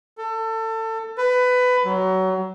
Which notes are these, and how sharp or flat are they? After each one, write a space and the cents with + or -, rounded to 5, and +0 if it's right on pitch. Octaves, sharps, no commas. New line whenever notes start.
A4 +25
B4 +20
F#3 +25